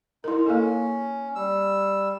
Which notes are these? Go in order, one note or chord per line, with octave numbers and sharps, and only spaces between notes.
D#4 E4 A#4
A#3 C#4 A4
G3 E6